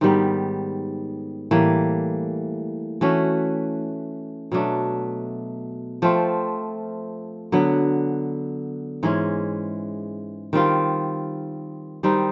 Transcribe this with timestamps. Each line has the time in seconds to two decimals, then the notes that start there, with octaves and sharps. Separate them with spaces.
0.01 G#2 D#3 G3 B3
1.51 A2 E3 G3 A#3
3.01 E3 A3 C#4 F#4
4.52 B2 F#3 A3 D4
6.02 F3 A3 C4 F4
7.52 D3 F#3 B3
9.03 G#2 E3 G#3 C#4
10.53 D#3 G3 C4 F4
12.03 D#3 G3 C4 D#4